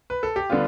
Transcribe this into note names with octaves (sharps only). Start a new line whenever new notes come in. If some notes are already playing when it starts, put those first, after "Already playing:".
B4
A4
G4
D3 G3 B3 D4 F4